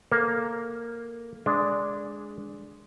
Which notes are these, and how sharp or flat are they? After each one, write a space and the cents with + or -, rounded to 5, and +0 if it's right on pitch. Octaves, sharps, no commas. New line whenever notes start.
A#3 +0 A4 +0
G#3 +0 D4 -5